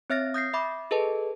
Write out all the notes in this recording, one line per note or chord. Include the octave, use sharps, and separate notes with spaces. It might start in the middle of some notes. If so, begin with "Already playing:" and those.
C4 C#5 E5 F6 A6 A#6
D#6 G6 A#6 C7
E5 B5 D6
G#4 A4 B4 D#5 A5